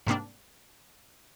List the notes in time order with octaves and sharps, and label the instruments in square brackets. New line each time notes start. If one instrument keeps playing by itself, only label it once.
[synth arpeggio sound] G#2 C3 G3 A#3 C4 D4